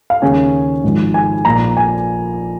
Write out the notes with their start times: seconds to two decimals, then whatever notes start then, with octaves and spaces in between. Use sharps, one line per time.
0.10 F5
0.22 D#2 C#3 G#3 C#4 G#5
0.84 G#1 G#2 F3
1.14 G#5
1.45 A#1 A#2 F3 A#3 A#5
1.77 G#5